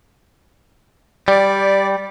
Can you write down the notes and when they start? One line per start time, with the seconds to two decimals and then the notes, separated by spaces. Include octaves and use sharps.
1.28 G3 D5